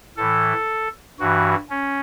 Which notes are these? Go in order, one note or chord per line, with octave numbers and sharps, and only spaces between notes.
A2 E3 A4
G2 E3 F#4
C#4